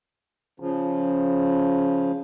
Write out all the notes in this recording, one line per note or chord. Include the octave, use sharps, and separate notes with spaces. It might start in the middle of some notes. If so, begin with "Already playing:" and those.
C#3 F3